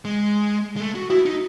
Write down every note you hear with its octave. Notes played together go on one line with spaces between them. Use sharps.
G#3
G#3
A3
F#4
E4 F#4
D#4